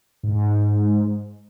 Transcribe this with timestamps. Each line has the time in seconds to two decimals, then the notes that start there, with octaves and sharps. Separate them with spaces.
0.23 G#2